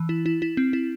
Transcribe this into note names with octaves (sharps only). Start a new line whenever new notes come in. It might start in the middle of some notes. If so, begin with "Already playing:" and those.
Already playing: E3
E4
E4
E4
C4
E4